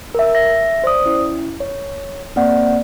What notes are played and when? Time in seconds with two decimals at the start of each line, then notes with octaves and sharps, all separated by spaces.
0.15 A#4 E5
0.35 E5 A#6
0.84 C5 D5 D#6
1.05 C#4 E4
1.60 C#5
2.36 A#3 C4 D5 F#5